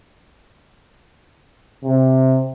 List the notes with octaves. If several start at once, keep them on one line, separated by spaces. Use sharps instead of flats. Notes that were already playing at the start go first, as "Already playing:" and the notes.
C3